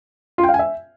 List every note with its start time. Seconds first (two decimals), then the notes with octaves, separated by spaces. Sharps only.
0.38 F4
0.43 G5
0.49 F5
0.54 G#5
0.59 E5